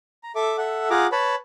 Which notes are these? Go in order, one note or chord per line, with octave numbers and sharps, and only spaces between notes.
A#5
A4 E5 D6
A4 E5 F#5
F4 G#4 F#5 A#5 D6
B4 C#5 A5 B5